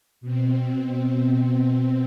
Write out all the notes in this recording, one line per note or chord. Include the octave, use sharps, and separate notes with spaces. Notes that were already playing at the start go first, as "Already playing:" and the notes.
B2 C4